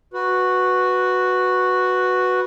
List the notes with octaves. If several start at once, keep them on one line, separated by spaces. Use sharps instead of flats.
F#4 B4